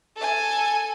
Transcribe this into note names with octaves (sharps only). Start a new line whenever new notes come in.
A4 G#5